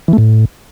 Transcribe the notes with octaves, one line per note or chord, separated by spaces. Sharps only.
E3
A3
A2